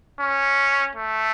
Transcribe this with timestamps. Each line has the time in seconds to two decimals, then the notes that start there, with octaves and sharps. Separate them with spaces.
0.20 C#4
0.95 A3